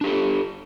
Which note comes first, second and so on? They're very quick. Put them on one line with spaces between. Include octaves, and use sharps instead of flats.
D4 G4 A4